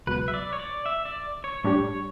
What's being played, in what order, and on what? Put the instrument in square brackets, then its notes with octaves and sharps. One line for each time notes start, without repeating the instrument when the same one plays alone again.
[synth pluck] C#2 B2 F#3 [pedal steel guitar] B4
[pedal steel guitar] E5
D5
C#5
D5
E5
D5
C#5
[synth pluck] A2 G3 D4 G4 [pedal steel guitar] C#5